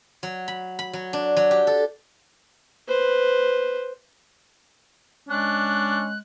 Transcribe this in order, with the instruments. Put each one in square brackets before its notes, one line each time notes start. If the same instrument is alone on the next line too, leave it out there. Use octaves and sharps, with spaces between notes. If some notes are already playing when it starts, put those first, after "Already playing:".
[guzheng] F#3
B5
B5
F#3
D4
F#3
G4
A4
[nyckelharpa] B4 C5
[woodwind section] G#3 [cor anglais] C#4 [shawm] D4 [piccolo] F#6